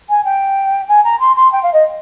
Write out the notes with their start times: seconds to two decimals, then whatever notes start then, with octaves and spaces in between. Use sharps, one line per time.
0.09 G#5
0.25 G5
0.88 G#5
1.04 A#5
1.20 C6
1.36 C6
1.52 G5
1.63 F5
1.73 D#5